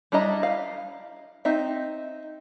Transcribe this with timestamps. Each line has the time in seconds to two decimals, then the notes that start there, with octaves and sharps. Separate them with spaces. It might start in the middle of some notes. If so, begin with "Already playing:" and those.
0.12 G3 D4 E4 D#5 A#5
0.43 F5
1.45 C4 D#4 E5